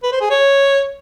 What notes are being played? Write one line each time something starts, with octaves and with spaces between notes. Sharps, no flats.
B4
C5
G#4
C#5